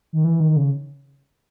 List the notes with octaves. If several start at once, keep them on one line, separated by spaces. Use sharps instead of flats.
D#3
E3
D#3
C#3